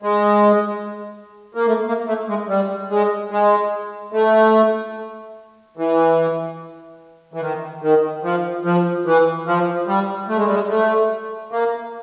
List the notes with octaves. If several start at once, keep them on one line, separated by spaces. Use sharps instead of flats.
G#3
A#3
A3
A#3
A3
G#3
G3
G#3
G#3
A3
E3
E3
D#3
D#3
F3
F3
E3
F3
G3
A3
G#3
G3
G#3
A3
A#3